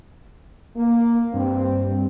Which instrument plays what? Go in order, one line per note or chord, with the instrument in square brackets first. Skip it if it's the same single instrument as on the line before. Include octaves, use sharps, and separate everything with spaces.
[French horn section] A#3
[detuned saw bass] G2 [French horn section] C4